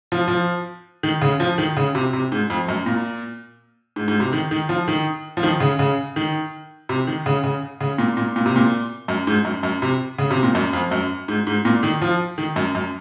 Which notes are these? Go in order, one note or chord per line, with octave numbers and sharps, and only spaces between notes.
F3
F3
D#3
C#3
F3
D#3
C#3
C3
C3
G#2
F2
F#2
A#2
G#2
G#2
C3
D#3
D#3
F3
D#3
F3
D#3
C#3
C#3
D#3
C3
D#3
C#3
C#3
C#3
A#2
A#2
A#2
C3
A#2
F#2
G#2
F#2
F#2
C3
C#3
C3
A#2
F#2
F2
F#2
G#2
G#2
A#2
D#3
F3
D#3
F#2
F#2